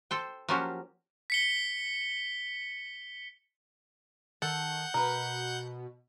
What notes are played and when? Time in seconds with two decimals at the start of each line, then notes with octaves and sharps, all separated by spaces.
0.11 A4 C5 G5
0.48 F3 F#3 A#3 C#4 F#4 G4
1.30 B6 C#7 G7
4.42 D#3 A4 F#5 G6
4.94 B2 A#4 B4